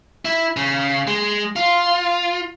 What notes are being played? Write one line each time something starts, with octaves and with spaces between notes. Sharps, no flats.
E4
C#3
G#3
F4